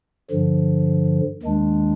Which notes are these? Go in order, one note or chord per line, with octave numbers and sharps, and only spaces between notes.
G2 D3 F3
D#2 D#3 G#3 D4